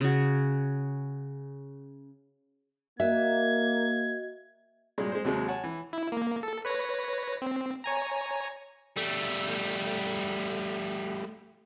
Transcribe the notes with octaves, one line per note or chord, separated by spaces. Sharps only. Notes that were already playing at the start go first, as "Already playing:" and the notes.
C#3 F#4
A#3 F#4 D#5 E5 G#6
G2 A#2 F#3 G#3
G#3 C5
D#2 C3 F#3 G#3
C#5 F#5 G#5 A5
E3
E4
A#3
A4
B4 C#5 A#6
C4
C#5 G#5 A#5
G3 A3